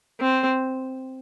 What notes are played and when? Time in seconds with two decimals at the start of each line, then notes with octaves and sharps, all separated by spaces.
0.20 C4